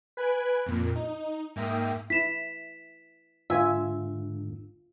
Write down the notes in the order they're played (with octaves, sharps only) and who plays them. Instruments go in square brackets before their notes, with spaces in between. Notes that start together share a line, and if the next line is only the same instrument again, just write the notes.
[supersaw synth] B4 G#5 F#6 G#6 D7
F2 A#2
D#4
G#2 A#3 E5 G5 D#6
[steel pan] E4 [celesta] B6 E7
[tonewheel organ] G#2 D3 [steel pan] F4 G#5 [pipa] E5